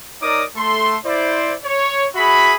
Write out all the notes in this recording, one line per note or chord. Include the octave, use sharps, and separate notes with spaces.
D#4 A#4 C#5 D5 D6 D#6
A3 A4 C6
E4 C5 D5
C#5
F#4 G#4 E5 B5